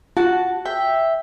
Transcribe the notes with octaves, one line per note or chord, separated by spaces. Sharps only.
F4 F#4 A5
E5 G5